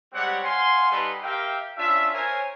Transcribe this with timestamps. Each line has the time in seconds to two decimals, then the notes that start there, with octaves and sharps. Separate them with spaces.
0.13 G3 G#3 C4 G4 C#5 F#5
0.44 F5 F#5 G#5 C6
0.91 G3 D#4 G4 A4 B4 C6
1.22 G4 A#4 E5 F5 G5
1.78 C#4 D4 F4 E5
2.14 A#4 C5 C#5 G#5